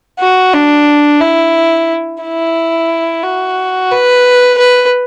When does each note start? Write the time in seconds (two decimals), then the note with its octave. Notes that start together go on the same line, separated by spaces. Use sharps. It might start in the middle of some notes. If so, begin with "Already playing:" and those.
0.19 F#4
0.54 D4
1.21 E4
2.22 E4
3.24 F#4
3.91 B4
4.58 B4